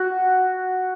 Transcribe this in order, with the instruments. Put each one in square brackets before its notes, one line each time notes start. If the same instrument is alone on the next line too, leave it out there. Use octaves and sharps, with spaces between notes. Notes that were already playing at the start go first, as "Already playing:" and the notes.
Already playing: [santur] F#4